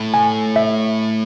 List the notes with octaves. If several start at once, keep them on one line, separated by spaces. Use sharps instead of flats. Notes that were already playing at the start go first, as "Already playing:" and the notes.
Already playing: A2
G#5
E5